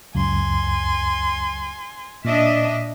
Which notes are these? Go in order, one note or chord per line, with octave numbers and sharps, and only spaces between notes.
C#2 F#2 G#5 C6
A#2 D4 D#5 E5